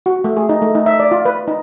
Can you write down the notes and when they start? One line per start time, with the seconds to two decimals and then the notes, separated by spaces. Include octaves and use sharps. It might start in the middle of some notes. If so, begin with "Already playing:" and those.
0.06 F#4
0.24 A3
0.37 G#4
0.49 D#4
0.62 A3
0.75 D#4
0.86 E5
1.00 D5
1.11 F4
1.25 B4
1.48 D#4